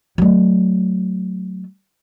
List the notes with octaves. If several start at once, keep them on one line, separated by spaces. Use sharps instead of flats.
F#3 A3